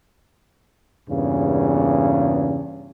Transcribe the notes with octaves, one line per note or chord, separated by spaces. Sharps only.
E2 G2 A#2 C#3